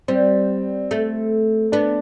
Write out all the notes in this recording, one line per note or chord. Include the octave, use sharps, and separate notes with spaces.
G3 C4
A3
B3 D4